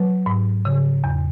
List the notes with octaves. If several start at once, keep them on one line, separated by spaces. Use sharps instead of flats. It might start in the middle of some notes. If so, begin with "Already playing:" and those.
Already playing: F#3 B4
G#2
C#3
E2